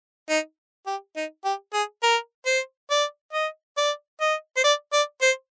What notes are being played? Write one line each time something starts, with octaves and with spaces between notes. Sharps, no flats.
D#4
G4
D#4
G4
G#4
A#4
C5
D5
D#5
D5
D#5
C5
D5
D5
C5